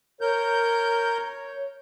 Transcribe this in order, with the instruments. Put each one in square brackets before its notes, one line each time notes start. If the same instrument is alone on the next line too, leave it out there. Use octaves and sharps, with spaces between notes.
[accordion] A#4 G6 [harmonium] C#5